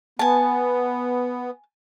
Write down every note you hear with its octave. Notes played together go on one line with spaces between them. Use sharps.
B3 G#5 A5